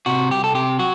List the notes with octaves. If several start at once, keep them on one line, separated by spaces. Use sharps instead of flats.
C3 F#4
C2 G4
A4
C3 G4
F#3 F#4